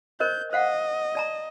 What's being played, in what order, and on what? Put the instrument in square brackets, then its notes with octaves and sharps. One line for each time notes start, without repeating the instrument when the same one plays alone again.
[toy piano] A#4 C5 D#5 [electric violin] G6
[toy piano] C5 F5 F#5 [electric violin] D#5
[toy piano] D5 A5 A#5